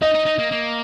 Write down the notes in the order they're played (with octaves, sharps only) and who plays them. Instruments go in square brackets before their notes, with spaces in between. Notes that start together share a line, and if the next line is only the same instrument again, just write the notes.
[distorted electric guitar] D#4 [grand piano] D#5
[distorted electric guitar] D#4
D#4
A#3
A#3